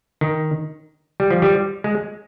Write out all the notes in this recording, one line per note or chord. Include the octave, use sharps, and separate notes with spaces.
D#3
G3
F3
G3
G#3